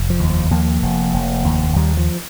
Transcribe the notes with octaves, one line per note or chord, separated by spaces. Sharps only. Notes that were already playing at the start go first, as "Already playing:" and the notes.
Already playing: F1
F3
D#2
F3
D#2 F3 A#3
F1
F1
D#2
D#2 D#3 G3
F3